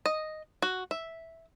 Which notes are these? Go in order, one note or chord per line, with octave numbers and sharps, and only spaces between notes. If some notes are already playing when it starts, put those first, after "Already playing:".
D#5
F#4
E5